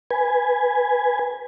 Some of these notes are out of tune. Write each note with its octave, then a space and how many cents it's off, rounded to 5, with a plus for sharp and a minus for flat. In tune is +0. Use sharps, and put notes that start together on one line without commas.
B4 +0 G#5 +0